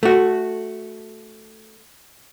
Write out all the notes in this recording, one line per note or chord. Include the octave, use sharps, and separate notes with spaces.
A3 F#4